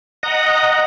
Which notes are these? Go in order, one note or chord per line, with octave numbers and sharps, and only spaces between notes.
D#5 F#5 A#5